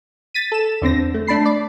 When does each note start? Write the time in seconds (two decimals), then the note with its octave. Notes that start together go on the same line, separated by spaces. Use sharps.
0.34 A6 B6 D#7
0.52 A4 E7
0.82 E2 D3 C4 A#6
1.14 A3
1.27 A3 D4 A5 B5 C7
1.45 D5